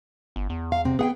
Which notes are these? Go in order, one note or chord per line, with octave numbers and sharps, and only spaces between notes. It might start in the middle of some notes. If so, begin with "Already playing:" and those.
G1
E2
F5
C3 C4
B3 G#4 F#5 G5